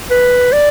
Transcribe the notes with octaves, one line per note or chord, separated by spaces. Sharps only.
B4
D5